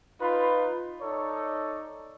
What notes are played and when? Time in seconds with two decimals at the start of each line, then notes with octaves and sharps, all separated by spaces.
0.21 D#4 F4 B4 B5
1.02 D#4 A4 C#5 D5